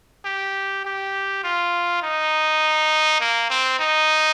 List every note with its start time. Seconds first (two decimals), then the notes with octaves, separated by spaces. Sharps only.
0.25 G4
0.85 G4
1.43 F4
2.02 D#4
3.20 A#3
3.50 C4
3.79 D#4